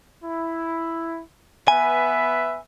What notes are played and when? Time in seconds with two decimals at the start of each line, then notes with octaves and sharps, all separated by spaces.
0.24 E4
1.68 B3 B4 E5 G#5